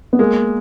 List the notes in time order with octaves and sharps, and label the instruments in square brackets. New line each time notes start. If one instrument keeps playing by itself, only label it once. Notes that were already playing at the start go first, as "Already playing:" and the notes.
[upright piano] B3
[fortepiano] G#3 [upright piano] A#3